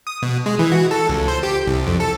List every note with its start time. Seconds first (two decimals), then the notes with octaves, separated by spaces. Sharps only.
0.07 D#6
0.22 B2
0.46 G#3
0.59 E3
0.72 F#4
0.91 A4
1.09 C#2
1.28 C5
1.43 G4
1.67 C2
1.87 F2
2.00 A4